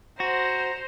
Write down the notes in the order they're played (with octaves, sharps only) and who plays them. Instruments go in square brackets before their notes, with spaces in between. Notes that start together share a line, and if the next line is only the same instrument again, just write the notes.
[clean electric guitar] F#4 [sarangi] C5 [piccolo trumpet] A#5